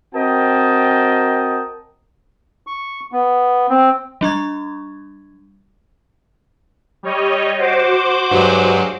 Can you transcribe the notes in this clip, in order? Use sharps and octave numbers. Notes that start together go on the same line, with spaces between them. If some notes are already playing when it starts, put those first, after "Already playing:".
C4 F#4 A#4 D#5 G5 A5
C#6
B3
C4
G3 D4 C#6 G#6
G3 C#5 D#5
F#4 C5 D6
G2 F#3 G#3